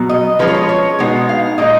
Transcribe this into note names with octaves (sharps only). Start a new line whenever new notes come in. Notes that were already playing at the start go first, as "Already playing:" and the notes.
Already playing: B2 F#3 B3
D#5
F3 G#3 C#4 F4 B4
C#5
B4
C#5
B2 G#3 B3 D#4
F5
A#2 G#3 D#4 D#5